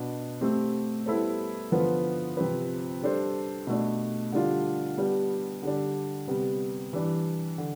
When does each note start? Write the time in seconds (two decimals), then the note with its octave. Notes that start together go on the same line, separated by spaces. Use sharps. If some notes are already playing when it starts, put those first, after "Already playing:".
Already playing: B2 B3 D4
0.41 A3 C4 G4
1.06 G3 B3 E4 A4 C5
1.71 D3 F3 B3 F4 B4
2.37 C3 F3 C4 G4 B4
3.02 G3 D4 A4 C5
3.67 B2 A3 D4
4.32 D3 G3 D4 F4
4.98 G3 B3 D4
5.63 D3 G3 D4
6.28 C3 G3 B3
6.93 E3 G3 D4 G4
7.58 D3